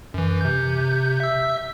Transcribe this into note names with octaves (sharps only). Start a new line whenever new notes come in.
F#2 E3
C3 G6
E5 E6